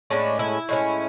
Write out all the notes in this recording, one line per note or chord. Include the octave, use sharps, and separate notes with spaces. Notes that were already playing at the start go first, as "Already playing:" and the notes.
A2 G#3 C#4 D4
E4
A2 G#3 C#4